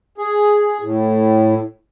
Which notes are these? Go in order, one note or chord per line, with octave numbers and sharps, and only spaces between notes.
G#4
A2